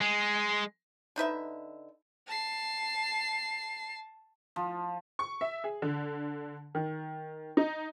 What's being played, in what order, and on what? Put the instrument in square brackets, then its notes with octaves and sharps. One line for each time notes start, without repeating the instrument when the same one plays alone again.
[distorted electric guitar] G#3
[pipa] D3 D#4 B4 E5
[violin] A5 C7
[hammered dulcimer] F3
[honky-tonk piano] C#6
E5
G#4
D3
D#3
D#4